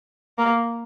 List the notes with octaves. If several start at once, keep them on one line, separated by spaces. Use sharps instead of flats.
A#3